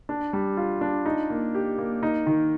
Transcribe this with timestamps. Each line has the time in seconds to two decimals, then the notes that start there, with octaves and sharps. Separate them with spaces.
0.09 D4
0.33 G3
0.57 F4
0.81 D4
1.06 D#4
1.30 A#3
1.55 G4
1.78 A#3
2.03 D#4
2.27 D#3